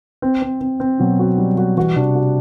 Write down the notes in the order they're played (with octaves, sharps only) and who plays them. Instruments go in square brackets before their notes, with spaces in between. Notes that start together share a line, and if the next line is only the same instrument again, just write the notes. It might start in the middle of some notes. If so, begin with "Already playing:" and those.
[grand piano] C4
C4
C4
C4
[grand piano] B2 [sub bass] F#3
[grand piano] F#4
G3
F#4
[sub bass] E3 [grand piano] F#4
[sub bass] C3 [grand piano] D4
[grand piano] F#4